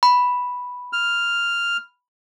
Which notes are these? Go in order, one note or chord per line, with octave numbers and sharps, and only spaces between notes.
B5
F6